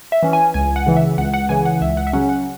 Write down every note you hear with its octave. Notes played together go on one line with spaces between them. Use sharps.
E5
E3 C#4
G#5
C#2 G#5
F#5
C#3 E3
E5
C#2 F#5
F#5
C#3 E3 G#5
F#5
C#2 E5
F#5
E5
C#3 F#3 C#4 F#5
F#5